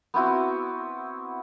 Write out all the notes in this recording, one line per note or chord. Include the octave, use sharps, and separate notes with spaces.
B3 C4 E4 F#4